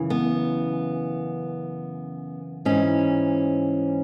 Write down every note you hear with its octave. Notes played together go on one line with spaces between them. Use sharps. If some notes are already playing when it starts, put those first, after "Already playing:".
Already playing: F#2 C#3 E3
B3
G#2 E3 C#4